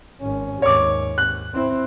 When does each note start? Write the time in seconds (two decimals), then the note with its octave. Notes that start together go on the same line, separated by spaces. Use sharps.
0.20 G#1 C#4
0.62 D#2 G#2 C#5 D6
1.18 F#6
1.54 C4 E4